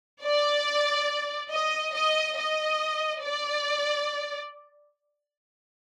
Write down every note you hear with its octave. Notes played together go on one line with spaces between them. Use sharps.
D5
D#5
D#5
D#5
D5